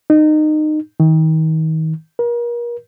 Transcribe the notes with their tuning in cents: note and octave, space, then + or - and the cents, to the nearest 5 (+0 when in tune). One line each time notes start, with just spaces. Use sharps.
D#4 -25
D#3 +35
A#4 +35